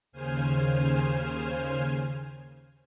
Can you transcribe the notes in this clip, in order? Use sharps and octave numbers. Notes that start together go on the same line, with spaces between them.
D#2 C#3 C5 G#5 F6